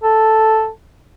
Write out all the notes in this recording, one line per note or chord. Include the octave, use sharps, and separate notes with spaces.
A4